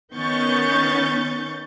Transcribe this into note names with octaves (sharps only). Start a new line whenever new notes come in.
D#3 B3 C#4 C#6 G6 A6